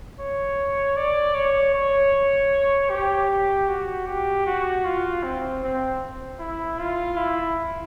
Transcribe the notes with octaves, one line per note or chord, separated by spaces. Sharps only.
C#5
D5
C#5
C#5
G4
F#4
G4
F#4
F4
C4
C4
E4
F4
E4